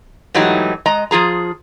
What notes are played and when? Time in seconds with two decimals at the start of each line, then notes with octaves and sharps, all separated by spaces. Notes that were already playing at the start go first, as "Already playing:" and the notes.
0.34 G#2 E3 F#3 A3 D#4 G4
0.86 G#3 D#5 A#5
1.11 F3 F4 G#4 A#5